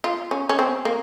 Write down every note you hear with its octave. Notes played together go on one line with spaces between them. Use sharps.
F4
C#4
C#4
C4
A#3